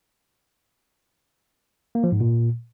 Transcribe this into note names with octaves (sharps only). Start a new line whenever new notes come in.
A#3
F3
G#2
A#2